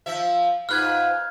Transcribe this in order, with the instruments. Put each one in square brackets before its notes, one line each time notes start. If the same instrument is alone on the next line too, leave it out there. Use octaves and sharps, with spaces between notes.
[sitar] F3 E5
[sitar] G#2 F4 B4 [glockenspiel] F6 F#6 G#6